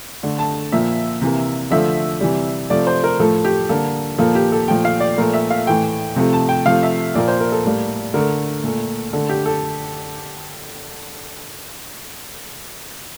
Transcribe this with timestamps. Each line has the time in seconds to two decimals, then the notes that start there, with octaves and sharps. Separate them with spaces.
0.23 D3 A3
0.39 A5
0.72 A#2 F3 A#3 E5
1.22 C3 E3 A#3
1.71 D3 F3 A3 E5
2.21 C3 E3 G3
2.70 C3 F3 A3 D5
2.87 C5
3.04 A#4
3.19 A2 F3 A3 A4
3.45 G4
3.69 D3 G3 A#3 A4
4.18 A#2 F3 A#3 A4
4.35 G4
4.52 A4
4.68 A#2 F3 A3 G5
4.85 F5
5.00 D5
5.18 A#2 F3 A3 A#4
5.33 E5
5.51 F5
5.67 A2 E3 A3 G5
6.16 C3 F3 A3
6.33 A5
6.49 G5
6.65 C3 F3 A3 F5
6.83 E5
7.15 A#2 F3 A#3 D5
7.28 C5
7.40 A#4
7.52 A4
7.65 A2 G3 A#3
8.14 D3 A3 A#4
8.64 A#2 A3
9.13 D3 A3 A4
9.29 G4
9.46 A4